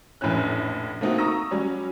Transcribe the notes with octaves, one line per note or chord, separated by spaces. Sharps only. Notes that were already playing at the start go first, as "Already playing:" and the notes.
F1 A#1 A2 E3 C#4 F#6
A3 A#3 C4 D#4 F4 F#4
A#5 C#6 D#6 E6 A#6
F#3 G3 C#4